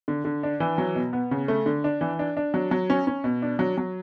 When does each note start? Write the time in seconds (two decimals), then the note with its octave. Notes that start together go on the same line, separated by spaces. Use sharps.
0.08 D3
0.25 D3
0.43 D4
0.60 E3
0.78 F#3
0.95 B2
1.13 B3
1.31 C#3
1.48 A3
1.66 D3
1.84 D4
2.01 E3
2.19 D4
2.37 D4
2.54 F#3
2.71 F#3
2.90 C#4
3.07 C#4
3.24 B2
3.42 D4
3.59 F#3
3.78 F#3